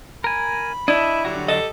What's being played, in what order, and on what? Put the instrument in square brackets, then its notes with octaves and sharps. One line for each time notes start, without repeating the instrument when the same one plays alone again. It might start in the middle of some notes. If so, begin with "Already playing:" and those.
[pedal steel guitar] A#4 G#5 [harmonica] B5
[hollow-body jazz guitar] D4 [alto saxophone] E4 [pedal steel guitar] D#5 E5
[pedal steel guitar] D3 F#3 F#4 [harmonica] G3
[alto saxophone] A4 [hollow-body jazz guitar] D#5